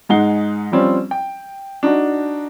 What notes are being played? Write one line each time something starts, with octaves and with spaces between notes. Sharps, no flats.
G#2 G#3 D#4 F#5 C7 G7
F3 G3 C4 C#4
G5
D4 D#4 F#4